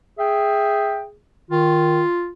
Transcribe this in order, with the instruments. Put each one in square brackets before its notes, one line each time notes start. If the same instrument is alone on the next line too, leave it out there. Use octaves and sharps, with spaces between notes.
[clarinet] G#4 [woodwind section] E5 G5
[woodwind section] D#3 [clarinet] F4